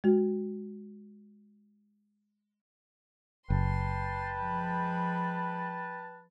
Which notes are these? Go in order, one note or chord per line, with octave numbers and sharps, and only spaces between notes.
G#3 F#4
F#1 B4 G5 A5 C6
F3 G#3 B5